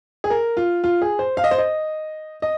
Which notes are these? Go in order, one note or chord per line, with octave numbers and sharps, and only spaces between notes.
G#4
A#4
F4
F4
G#4
C5
F5
D#5
C5
D#5
D#5